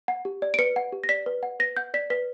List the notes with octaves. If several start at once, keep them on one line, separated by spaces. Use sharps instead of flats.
F#5
G4
D5
D7
B4 C#7
F#5
G4
A#6
D5 B6
B4
F#5
B4 A#6
F#5 G6
D5 B6
B4 B6